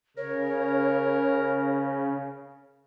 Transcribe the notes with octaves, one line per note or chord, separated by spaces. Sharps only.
C#3 A#4 C#5